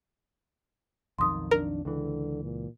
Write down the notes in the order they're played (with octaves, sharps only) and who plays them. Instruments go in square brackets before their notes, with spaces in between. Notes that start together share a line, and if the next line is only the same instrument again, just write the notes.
[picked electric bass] B1 F2 D#3 [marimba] C6 D#6
[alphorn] D4 [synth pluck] A#4
[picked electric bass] C#2 E3 [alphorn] D3
[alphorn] A#2